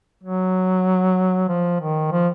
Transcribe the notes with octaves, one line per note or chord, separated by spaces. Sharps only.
F#3
F3
D#3
F3